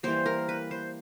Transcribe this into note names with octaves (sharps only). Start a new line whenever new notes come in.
E3 G3 A#3 C5
A#4
B4
C5